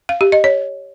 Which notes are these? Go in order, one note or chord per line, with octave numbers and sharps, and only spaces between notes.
F5
G4
D#5
C#5